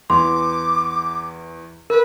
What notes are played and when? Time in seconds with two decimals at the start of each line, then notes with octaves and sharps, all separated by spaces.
0.10 E2 E3 C6 D6
1.90 A#4 B4